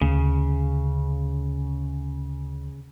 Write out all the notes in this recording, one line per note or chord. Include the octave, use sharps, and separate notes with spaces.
D2 C#3